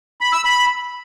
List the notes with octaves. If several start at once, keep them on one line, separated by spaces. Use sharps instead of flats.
B5
E6
B5